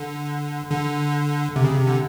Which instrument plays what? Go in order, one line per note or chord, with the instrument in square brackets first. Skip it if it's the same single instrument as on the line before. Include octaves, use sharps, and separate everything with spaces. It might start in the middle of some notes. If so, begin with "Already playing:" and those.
Already playing: [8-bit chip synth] D3
D3
C3
C#3
C3
D3